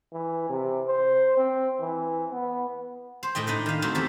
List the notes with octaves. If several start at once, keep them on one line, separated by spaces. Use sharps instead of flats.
E3
C3
C5
C4
E3
B3
C5
A2 A3 D#5 G5
D4 D#4 B4 D#5
D#3 F5
F#3 A3 C4 D#4
E2 C3 G4 A5